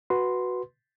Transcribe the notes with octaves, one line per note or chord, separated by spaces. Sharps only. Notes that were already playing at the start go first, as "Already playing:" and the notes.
F#4 B4 C6